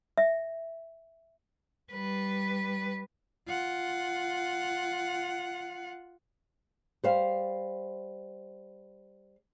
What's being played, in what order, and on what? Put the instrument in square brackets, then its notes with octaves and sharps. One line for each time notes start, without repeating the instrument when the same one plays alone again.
[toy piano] E5
[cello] G3 B4
F4 F#5
[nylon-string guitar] G3 C5 F5